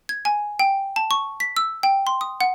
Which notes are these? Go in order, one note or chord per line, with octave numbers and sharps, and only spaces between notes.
G#6
G#5
G5
A5
C#6
B6
E6
G5
C6
D#6
F#5